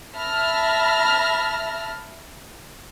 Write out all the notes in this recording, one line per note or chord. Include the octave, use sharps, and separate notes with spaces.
E5 A5 B5 F6 A#6